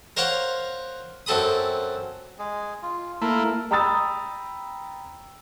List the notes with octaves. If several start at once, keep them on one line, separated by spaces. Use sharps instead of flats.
A#4 C5 C#5 F5 F#5
F#2 C4 A4 B5 D#6
G#3 G#4
F4
A3 A#3 E4 A#4
G5 A#5 B5 D#6 E6 A6